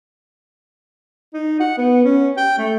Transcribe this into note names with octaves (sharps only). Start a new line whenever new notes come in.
D#4
F#5
B3
C#4
G5
A3